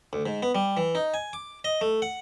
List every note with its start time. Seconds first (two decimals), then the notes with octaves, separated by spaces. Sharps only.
0.13 D2
0.26 G#2
0.43 B3
0.55 G3
0.77 E3
0.95 D#4
1.14 G#5
1.33 D6
1.64 D#5
1.81 A3
2.02 F#5